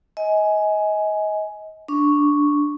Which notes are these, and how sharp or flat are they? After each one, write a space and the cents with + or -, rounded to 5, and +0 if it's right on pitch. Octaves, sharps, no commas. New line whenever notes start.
D#5 +30 G#5 +10
D4 +0 C#6 +0